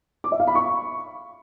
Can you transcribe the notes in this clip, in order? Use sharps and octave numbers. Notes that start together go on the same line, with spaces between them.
D6
E5
F5
B5
C#6